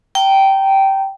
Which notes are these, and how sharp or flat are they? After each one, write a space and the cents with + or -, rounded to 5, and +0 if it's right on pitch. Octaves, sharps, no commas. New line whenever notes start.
G5 -15 A#5 -20